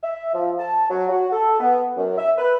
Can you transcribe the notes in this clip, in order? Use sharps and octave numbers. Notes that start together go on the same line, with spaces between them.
E5
F3
A5
F#3
F#4
A4
B3
F#2
E5
B4